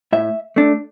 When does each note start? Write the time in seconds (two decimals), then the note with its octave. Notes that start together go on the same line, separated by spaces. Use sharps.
0.13 A2 E5
0.56 A3 D4